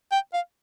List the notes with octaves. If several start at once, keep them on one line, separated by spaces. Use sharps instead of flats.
G5
F5